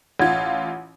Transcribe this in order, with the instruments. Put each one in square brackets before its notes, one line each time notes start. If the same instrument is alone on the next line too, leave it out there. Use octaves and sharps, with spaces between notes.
[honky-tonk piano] A1 F4 [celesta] F#5 G#6